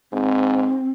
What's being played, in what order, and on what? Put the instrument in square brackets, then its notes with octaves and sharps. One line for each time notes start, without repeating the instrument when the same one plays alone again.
[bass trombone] G#2 [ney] C4